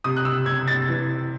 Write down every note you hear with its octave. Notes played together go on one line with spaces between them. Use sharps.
C3 D#6
F#6
E6
C3 G#6
A6
E3